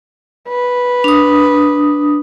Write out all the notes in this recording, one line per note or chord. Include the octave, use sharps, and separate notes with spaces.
B4
D4 D#6